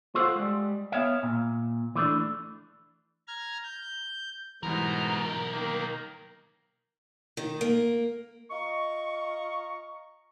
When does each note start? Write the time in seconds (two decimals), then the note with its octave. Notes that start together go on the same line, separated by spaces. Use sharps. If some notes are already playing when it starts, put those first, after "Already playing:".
0.15 F4 A4 C5 D5 F5 F#5
0.36 G3 G#3
0.92 B3 C#5 E5 F5
1.23 A#2
1.95 E3 A3 D4
3.27 A#5 F6 G#6
3.63 G6
4.63 B1 G#2 B2 E3 G3 A#4
5.52 D#3 A#3
7.37 D#3
7.61 A#3
8.51 F4 D#5 A#5 C#6